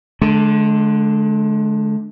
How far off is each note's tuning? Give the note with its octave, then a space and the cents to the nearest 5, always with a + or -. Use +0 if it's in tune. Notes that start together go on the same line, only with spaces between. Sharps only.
D3 +0 G#3 +40